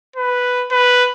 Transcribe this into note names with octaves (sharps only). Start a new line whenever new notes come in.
B4
B4